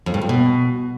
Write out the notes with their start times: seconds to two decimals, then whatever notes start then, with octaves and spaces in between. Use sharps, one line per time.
0.06 F2
0.14 G2
0.22 F2
0.29 B2